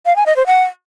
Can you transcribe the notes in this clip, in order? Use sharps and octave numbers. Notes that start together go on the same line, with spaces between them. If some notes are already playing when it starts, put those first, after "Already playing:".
F5
G#5
D#5
C5
F#5